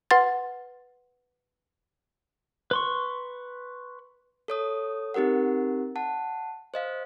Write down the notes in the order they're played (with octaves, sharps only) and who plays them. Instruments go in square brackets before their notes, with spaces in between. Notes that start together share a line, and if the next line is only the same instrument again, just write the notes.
[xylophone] B4 F#5 C6 A6
[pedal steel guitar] B4 C6 C#6
[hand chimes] A4 C#5 D#6
C4 D#4 G4 A#4 F#5
F#5 A5
C5 D#5 F5